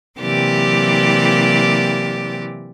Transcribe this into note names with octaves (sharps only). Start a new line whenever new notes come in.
C3 E3 F#3 A#3 G4 D5